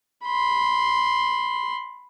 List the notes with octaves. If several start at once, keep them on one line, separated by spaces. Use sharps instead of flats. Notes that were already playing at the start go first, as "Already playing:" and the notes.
B5 C6